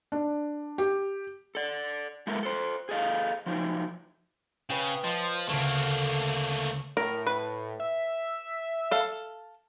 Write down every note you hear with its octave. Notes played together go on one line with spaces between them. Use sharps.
D4
G4
A4 D5
G#3 A3 B3 E4 A4 A#4
A4 C5
G#4 A4 D#5 F5
F3 F#3 D#4
C#3 B4 C#5 G5
F3 D#5 C6
D2 C#3 A3 A#3
A2 A#4
B4
E5
A4 F5